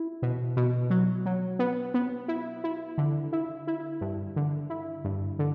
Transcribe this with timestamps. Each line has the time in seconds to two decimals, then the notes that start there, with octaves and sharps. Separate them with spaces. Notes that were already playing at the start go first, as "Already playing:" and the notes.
Already playing: E4
0.22 B2
0.57 B2
0.90 F#3
1.26 F#3
1.59 B3
1.94 B3
2.28 E4
2.64 E4
2.98 D3
3.33 E4
3.67 E4
4.01 G2
4.36 D3
4.70 E4
5.04 G2
5.39 D3